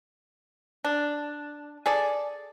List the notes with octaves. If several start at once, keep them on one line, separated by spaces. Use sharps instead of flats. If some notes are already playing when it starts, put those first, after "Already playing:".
D4
G#4 A4 D5